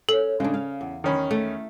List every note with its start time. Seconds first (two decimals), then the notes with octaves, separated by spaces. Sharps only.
0.09 C#4 A4
0.40 C#3 G#3 D4
0.54 F5
0.81 E2
1.04 D#3 C#4 B5
1.31 A3